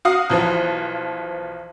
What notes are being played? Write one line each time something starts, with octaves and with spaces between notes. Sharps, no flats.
F#4 F5 D#6
B1 E3 F3